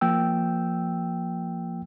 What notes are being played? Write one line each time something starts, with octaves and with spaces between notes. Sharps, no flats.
F3 A#3 G5 E6